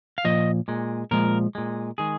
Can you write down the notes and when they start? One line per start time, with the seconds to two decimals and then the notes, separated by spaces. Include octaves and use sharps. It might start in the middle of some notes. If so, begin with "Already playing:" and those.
0.18 F5
0.25 A#2 F3 D#5
0.68 A#2 G#3
1.11 A#2 F3 G#3 A#4
1.55 A#2 G#3
1.98 D#3 G#3 G#4